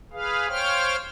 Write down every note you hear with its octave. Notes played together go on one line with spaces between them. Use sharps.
G#4 B4 F5
C5 C#5 F5 G5 F6